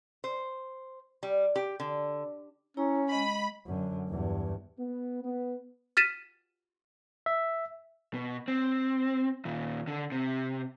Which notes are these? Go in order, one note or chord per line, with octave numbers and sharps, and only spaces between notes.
C5
G3
G4
D3
C#4 E4 C#5 A#5
G#3 D#5 B5
F#2 D3
E2 G2
B3
B3
F6 A6 B6 D#7 E7
E5
B2
C4
D#2 A#2
D3
C3